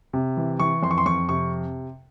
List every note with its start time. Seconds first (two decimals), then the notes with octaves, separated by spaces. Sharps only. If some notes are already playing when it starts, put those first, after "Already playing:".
0.13 C3
0.37 E3
0.60 E3 C#6
0.83 F2 C6
0.91 C#6
0.98 C6
1.06 F2 C#6
1.29 C3 C#6